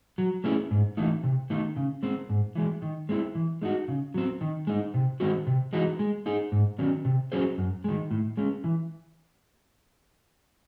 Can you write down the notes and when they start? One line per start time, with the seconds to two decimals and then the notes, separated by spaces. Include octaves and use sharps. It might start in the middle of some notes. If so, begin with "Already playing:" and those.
0.18 F#3
0.44 A3 C#4 E4 G#4
0.71 G#2
0.97 E3 A3 D#4
1.24 C3
1.50 D#3 A3 D#4
1.76 C#3
2.03 G#3 C4
2.30 G#2
2.55 E3 G#3
2.82 D#3
3.09 G#3 C4 E4
3.35 E3
3.62 G#3 D#4 F#4
3.88 C#3
4.14 F#3 C4
4.41 D#3
4.67 G#3 D#4
4.94 C3
5.20 D#3 G#3 C4 F#4
5.47 C3
5.73 E3 G#3 D#4 F#4
5.99 G#3
6.26 D#4 G#4
6.52 G#2
6.79 D#3 F#3 C#4
7.05 C3
7.32 F#3 C#4 G#4 C5
7.58 F#2
7.84 D#3 G#3
8.11 A2
8.37 G#3 C#4
8.64 E3